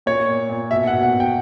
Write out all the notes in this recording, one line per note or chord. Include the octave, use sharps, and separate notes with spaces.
A#2 C#5
A#2
A#2
B2 E5
F#5
B2
F#5
B2
G5